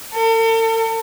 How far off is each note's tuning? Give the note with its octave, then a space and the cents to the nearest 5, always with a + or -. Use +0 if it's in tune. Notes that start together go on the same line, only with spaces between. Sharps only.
A4 +45